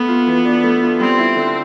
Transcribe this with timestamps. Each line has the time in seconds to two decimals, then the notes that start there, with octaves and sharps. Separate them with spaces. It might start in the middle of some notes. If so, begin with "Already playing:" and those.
Already playing: A3 B3
0.08 F4
0.27 E3
0.46 D4
0.64 A3
0.82 F4
1.00 G3 C4
1.18 E4
1.36 D3